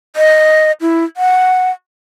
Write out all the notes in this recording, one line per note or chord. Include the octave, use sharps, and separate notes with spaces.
D#5
E4
F#5